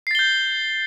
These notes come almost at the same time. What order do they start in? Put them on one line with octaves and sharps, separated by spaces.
C7 A6 G7 G6